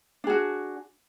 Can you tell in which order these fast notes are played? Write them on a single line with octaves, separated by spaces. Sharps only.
D4 G#4 F#4